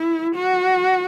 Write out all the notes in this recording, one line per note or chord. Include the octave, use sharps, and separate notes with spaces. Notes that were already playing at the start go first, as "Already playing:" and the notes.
Already playing: E4
F#4